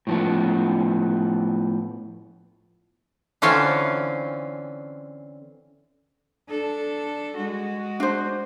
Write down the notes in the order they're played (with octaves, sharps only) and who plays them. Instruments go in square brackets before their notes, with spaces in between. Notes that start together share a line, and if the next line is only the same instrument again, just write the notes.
[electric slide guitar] A2 F3 B3
[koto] D3 E3 C4 C#4 F4 F5
[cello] D4 A4
G#3 F#4
[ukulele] D4 C5